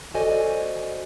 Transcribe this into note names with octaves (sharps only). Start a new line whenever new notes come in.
F#4 A4 C5 D5 D#5 G#5